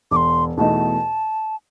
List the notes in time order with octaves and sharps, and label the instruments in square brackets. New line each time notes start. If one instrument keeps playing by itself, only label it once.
[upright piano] E1 [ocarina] D6
[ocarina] C6
[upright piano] E2 B2 A3 D#4 [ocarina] A5